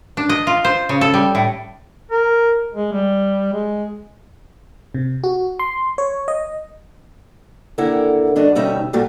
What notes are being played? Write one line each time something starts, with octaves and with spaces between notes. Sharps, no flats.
D4
D#5
F4
C5
C#3
A4
G3
A2
A#4
G#3
G3
G#3
C3
F#4
C6
C#5
D#5
D#2 D3 E4 A#4 F#5
G2 D3 D4 F#4 D#5
D2 B2 G3 C#4 D#4 E5
A#2 F#3 G3 A3 F4 F#4